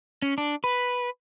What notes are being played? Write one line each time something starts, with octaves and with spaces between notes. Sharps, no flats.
C#4
D4
B4